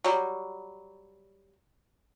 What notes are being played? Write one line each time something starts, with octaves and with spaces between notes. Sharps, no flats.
F#3 G3